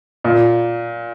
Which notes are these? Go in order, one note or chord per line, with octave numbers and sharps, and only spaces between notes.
A#2